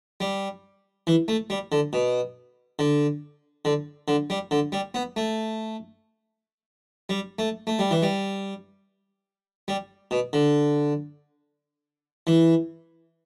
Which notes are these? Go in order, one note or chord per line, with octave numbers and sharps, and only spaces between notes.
G3
E3
A3
G3
D3
B2
D3
D3
D3
G3
D3
G3
B3
A3
G3
A3
A3
G3
E3
G3
G3
B2
D3
E3